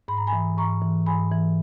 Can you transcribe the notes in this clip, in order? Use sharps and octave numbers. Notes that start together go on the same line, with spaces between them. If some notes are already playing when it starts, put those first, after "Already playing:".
G#2 B5
A#5
G#5 B5
E3
G#2 A#5 C#6
E3
G#2 G#5 B5
E3